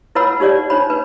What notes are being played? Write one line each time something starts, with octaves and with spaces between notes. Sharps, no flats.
E4 B4 C#5 F#5 B5 E6
D#4 G4 C#5 D5 F#5
D4 D#4 C5 C#5 B5
B4